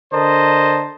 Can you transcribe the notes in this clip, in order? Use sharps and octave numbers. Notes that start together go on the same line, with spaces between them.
D3 A#4 C5 D#5 A5